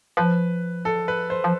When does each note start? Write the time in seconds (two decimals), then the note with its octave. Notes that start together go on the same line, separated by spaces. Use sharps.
0.17 F3 B4
0.85 A4
1.08 B4
1.30 C5
1.44 F3